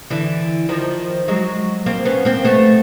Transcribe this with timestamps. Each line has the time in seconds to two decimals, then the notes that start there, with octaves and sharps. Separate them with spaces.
0.10 D3 E3
0.69 D#3 F3
1.28 F#3 G#3
1.86 A#3 C4
2.05 B3 C#4
2.25 A#3 C4
2.44 A3 B3